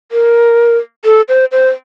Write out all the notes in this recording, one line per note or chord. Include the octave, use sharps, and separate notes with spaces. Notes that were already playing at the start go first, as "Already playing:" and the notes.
A#4
A4
C5
C5